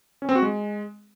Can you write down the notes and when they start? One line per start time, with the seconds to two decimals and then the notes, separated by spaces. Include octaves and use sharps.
0.22 C#4
0.29 C4
0.35 F#4
0.42 G#3